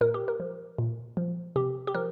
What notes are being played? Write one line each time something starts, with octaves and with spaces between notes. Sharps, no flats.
A#2 A#4
G4
A#4
F3
A#2
F3
C3 G4
G4
F3 A#4